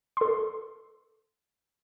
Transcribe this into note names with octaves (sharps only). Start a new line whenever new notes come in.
A4 C6